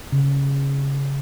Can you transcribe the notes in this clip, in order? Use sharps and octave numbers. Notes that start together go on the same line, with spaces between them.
C#3